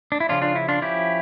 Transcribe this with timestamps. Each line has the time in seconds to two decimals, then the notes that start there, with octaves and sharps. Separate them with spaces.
0.12 D4
0.20 E4
0.29 C#3 F3 C#4 D4 F4
0.42 D4 F4
0.55 E4
0.69 D4 F4
0.82 F3 C#4 E4 G4